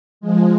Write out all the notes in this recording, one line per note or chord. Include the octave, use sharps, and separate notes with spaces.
F3 G#3